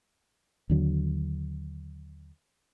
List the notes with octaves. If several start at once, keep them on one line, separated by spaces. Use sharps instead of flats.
D#2 D3 F#3